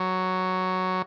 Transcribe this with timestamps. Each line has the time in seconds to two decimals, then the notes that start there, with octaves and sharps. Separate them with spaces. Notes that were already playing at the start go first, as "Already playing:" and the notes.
Already playing: F#3